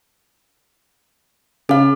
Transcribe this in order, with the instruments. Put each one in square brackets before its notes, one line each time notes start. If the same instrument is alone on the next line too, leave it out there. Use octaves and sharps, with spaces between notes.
[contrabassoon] C#3 [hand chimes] G#4 F5